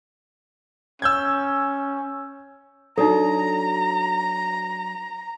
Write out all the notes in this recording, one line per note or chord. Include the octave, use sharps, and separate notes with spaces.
C#4 E6 G6 G#6
F#3 D4 D#4 A4 A#5